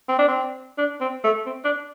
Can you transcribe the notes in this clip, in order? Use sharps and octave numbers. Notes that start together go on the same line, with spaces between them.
C4
D4
C4
D4
C4
A3
C4
D4